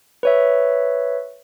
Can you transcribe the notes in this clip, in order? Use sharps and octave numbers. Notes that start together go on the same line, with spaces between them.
B4 C#5 E5